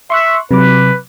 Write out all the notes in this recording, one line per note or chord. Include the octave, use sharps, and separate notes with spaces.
E5 C6 C#6 F#6
C3 F#3 B4 D6